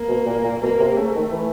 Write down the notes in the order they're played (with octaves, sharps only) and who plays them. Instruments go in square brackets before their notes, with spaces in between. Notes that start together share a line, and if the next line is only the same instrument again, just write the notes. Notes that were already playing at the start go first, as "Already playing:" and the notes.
Already playing: [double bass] A#3
[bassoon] B2
A#2
A#2
[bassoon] B2 [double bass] A#3
[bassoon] C3
[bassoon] C#3 [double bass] A3
[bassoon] D#3
E3